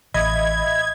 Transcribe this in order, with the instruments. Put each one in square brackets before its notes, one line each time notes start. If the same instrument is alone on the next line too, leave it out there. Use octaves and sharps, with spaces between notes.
[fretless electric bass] A1 [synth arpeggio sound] D#5 E5 B5 [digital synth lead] G#6